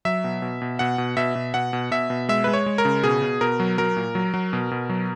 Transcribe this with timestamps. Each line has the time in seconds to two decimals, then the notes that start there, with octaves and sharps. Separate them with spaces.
0.05 F#3 E5
0.24 B2
0.42 B2
0.62 B2
0.79 B2 F#5
0.98 B2
1.17 B2 E5
1.35 B2
1.54 B2 F#5
1.73 B2
1.91 B2 E5
2.10 B2
2.29 G#3 E5
2.44 G#3 B4
2.53 C#5
2.66 G#3
2.78 A#4
2.85 C#3
3.03 B2 G#4
3.22 B2
3.41 B2 A#4
3.60 F#3
3.78 F#3 A#4
3.96 A#2
4.15 F#3
4.34 F#3
4.53 B2
4.71 B2
4.90 F#3